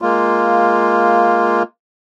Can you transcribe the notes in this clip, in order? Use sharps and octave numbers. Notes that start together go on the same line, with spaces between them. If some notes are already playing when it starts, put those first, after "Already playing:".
G#3 A#3 F4